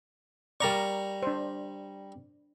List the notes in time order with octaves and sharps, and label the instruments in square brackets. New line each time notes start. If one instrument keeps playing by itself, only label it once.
[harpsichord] G3 A#5 C#6 [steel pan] A#4 D5
[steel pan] D4 C5